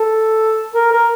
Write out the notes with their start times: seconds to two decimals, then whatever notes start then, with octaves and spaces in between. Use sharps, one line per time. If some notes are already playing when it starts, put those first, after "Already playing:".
Already playing: A4
0.74 A#4
0.92 A#4